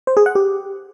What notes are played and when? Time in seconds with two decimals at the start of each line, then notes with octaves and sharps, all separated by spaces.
0.07 C5
0.17 G#4
0.26 F#5
0.35 G4